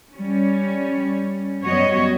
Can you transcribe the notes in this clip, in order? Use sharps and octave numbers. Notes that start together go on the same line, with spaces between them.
G3 C#4
F#2 G3 B3 F#4 C#5 D#5